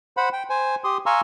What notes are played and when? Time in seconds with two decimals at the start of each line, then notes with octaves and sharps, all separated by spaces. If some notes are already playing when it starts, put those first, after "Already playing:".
0.17 C5 F#5 B5
0.33 G5
0.50 C5 G#5
0.84 G4 C6 D#6
1.06 F5 G#5 A#5 C6 C#6 E6